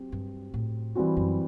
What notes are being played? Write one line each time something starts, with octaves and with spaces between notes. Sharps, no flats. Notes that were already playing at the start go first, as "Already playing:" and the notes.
Already playing: F#3 C4 G4
G2
A2
E3 G3 C4 F#4
F#2